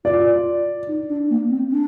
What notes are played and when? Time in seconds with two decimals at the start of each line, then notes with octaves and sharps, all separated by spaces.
0.05 F4 D5
0.88 D#4
1.09 D4
1.30 A#3
1.49 C4
1.71 D4